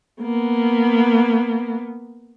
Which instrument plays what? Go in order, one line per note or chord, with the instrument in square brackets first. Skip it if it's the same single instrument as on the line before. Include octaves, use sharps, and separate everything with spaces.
[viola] A#3 B3